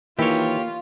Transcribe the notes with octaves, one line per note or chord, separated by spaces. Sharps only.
D#3 E3 A#3 E4 F4 G4 C#5